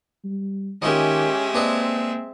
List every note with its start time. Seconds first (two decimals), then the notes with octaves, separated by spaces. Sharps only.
0.24 G3
0.82 D#3 G#3 A#3 C#4 F4 G4 D#5 E5
1.54 A#3 C4 D4 B4 D#5